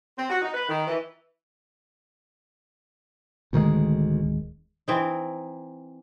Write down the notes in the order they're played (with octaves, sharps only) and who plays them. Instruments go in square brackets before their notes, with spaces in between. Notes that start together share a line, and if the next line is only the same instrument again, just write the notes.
[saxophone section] C4
F#4
D#4
B4
D#3
E3
[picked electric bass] D1 D#3 G#3 [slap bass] D2
[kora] E3 C4 D#4